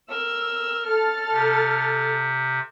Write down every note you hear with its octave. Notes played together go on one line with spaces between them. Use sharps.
A#4 E6
A4 F6 A6
C3